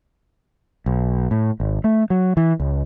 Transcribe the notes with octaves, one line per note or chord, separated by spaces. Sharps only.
B1
A2
G#1
A3
F#3
E3
C#2